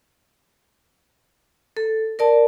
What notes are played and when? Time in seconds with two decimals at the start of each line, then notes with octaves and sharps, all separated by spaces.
1.77 A4
2.19 A#4 D5 A5